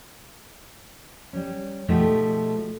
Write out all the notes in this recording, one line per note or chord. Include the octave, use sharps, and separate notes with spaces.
G3 C#4
B2 F3 A3 D#4 G4 G#4